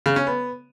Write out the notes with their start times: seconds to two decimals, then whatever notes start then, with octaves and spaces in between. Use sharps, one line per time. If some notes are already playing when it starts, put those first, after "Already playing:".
0.06 C#3
0.16 C#4
0.27 B3